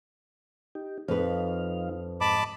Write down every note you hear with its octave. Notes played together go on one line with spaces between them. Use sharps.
D#4 G4
F2 F3 D#4 B4 F5
G#2 D#5 A5 B5 D6